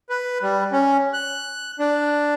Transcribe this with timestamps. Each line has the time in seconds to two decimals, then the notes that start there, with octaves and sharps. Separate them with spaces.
0.10 B4
0.42 G3
0.72 C#4
1.13 F#6
1.79 D4